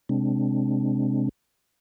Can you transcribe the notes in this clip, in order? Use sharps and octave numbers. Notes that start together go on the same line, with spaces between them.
C3 G#3 C4 D4